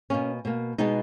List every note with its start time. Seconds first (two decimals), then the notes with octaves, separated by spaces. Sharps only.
0.10 B2 A#3 C#4
0.45 B2 A#3
0.78 B2 G#3 B3 D#4